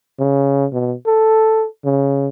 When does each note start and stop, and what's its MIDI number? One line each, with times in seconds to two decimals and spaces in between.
0.19 0.66 49
0.73 0.94 47
1.06 1.66 69
1.85 2.29 49